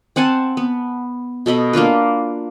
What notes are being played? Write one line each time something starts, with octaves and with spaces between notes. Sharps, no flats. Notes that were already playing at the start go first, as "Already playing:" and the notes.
C4 F#5 G#5 A5
B3
B2 A4 D#5 B5
A#3 D4 F4 B4